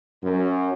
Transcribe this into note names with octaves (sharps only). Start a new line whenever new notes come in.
F#2